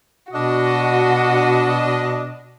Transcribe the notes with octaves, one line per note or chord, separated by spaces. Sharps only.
B2 D4 F#4 D#5